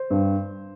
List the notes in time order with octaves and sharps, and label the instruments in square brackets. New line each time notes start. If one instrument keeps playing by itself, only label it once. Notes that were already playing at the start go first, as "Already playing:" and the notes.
Already playing: [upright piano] C5
G2